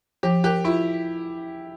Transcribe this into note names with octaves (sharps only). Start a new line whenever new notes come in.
F3 G4
G4 A#4
E4 F4